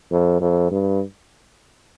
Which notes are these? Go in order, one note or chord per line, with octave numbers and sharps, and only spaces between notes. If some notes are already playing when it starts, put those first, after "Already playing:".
F2
F2
G2